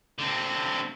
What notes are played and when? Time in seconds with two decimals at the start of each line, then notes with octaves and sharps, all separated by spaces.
0.18 D3 C4